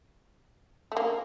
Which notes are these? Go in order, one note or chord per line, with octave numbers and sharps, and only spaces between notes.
A3
A#3